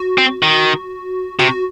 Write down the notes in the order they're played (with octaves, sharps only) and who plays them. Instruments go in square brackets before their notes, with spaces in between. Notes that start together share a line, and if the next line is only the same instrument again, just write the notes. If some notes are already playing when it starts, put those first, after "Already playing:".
Already playing: [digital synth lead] F#4
[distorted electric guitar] C4
D#3
[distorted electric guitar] C3 [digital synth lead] F#4